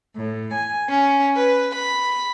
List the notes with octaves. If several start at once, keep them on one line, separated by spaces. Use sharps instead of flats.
A2
G#5
C#4
B4
B5